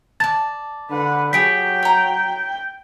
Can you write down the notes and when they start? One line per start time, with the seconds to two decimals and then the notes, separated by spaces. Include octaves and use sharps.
0.20 D5 A5 A6
0.90 D3 B4 F#5
1.33 F#3 G4 G#4 G5 C#6 B6 D7
1.83 C#5 A#5